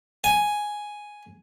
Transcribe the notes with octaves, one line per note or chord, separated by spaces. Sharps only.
G#5